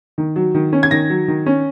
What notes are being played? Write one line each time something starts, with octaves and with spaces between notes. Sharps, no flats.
D#3
F#3
D#3
C#4
G#6
D#3 A#6
F#3
D#3
C#4